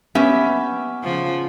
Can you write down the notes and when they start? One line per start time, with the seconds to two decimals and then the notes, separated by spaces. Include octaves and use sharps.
0.15 B3 C#4 G4 E5
1.03 C#3 F3